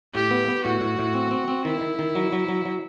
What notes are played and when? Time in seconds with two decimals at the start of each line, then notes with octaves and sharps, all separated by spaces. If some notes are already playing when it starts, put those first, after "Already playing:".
0.15 A2 G4
0.31 B3
0.48 B3
0.64 A2 F#4
0.81 A2
0.99 A2
1.14 C4
1.31 C4
1.48 C4
1.65 D#3 E4
1.81 D#3
1.99 D#3
2.15 F#3
2.32 F#3
2.48 F#3
2.65 F#3